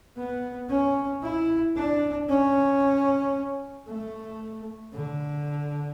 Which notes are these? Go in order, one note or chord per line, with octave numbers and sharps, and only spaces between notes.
B3
C#4
E4
D4
C#4
A3
D3